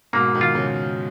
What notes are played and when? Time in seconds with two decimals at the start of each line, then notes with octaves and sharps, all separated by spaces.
0.13 G#2 B2 A#3
0.34 B2 D#3
0.41 F4
0.55 C#3